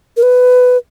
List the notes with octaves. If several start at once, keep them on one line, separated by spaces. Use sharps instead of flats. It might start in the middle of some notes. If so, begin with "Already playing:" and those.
A#4
B4